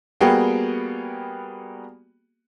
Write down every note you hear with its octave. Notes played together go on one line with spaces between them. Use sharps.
G3 A#3 B3 F#4 G#4 G5